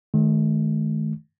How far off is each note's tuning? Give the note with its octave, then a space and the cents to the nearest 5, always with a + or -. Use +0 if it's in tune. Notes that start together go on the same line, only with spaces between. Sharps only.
D#3 +0 A3 -40